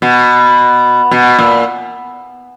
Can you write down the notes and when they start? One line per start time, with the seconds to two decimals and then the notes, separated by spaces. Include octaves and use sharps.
0.02 B2
1.11 B2
1.38 A#2